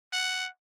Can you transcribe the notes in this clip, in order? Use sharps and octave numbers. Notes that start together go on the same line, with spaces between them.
F#5